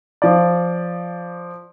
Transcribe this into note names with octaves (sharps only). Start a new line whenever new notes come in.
F3 D5